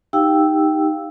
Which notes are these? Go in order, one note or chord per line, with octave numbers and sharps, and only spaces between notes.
D#4 G4 F5 G5 E6